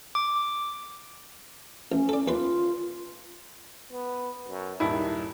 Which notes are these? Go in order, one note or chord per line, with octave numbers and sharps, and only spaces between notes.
D6
A1 C#4
A4 D5
D#2 F4 B4 C6
B3
F#2
D#1 G2 D#3 E4